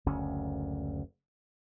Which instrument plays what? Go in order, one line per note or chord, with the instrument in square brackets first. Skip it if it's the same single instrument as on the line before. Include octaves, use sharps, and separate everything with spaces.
[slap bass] F#1 D2 C#4